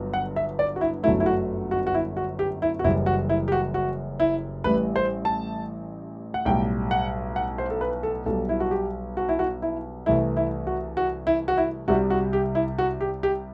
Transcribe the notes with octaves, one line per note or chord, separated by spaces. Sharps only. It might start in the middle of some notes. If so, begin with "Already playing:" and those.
Already playing: G1 G2 F#3
F#5
E5
D5
F#4
E4
G1 F#2 F#3 A3 E4
E4
F#4
F#4
F#4
E4
F#4
G4
E4
F#4
F#1 F#2 E3 G3 E4
F#4
E4
G4
F#4
F#4
E4
A1 A2 G3 B4
C5
A5
F#5
B1 A2 G3 G5
F#5
F#5
C5
A4
B4
A4
B1 B2 G3 A4
E4
F#4
G4
F#4
E4
F#4
E4
C2 C3 E3 A3 E4
E4
F#4
F#4
E4
F#4
E4
C2 C3 G3 F#4
F#4
G4
E4
F#4
G4
G4